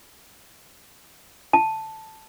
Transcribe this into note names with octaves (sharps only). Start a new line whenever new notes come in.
A5